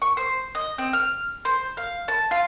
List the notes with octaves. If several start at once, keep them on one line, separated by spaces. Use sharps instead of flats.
C#6
C5
D#5
C4
F6
C5
F5
A5
F4